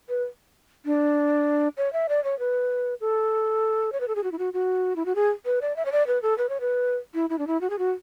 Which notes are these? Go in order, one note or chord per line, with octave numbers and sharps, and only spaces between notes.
B4
D4
C#5
E5
D5
C#5
B4
A4
C#5
B4
A4
G#4
F#4
E4
F#4
F#4
E4
F#4
G#4
B4
D5
E5
C#5
D5
B4
A4
B4
C#5
B4
E4
E4
D4
E4
F#4
G#4
F#4